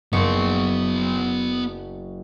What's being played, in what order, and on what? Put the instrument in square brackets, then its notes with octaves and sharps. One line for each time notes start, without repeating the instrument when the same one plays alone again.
[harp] F#1 C#6 [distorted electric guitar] B3 C6